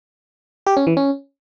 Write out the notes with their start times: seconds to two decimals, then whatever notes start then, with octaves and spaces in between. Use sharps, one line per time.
0.67 G4
0.77 C#4
0.87 E3
0.97 C#4